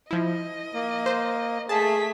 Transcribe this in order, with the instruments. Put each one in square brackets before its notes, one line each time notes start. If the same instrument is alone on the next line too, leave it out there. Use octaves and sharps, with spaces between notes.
[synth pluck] F3 E4 [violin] D#5
[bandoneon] A#3
[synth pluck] C5
[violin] A3 B6 [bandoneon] G#4 [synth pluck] A5